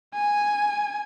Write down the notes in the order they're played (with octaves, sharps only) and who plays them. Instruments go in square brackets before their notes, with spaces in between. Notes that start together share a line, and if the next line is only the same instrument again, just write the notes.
[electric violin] G#5